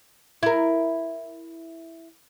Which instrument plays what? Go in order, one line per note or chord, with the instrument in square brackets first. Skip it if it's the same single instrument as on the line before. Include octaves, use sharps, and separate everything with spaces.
[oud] E4 A#4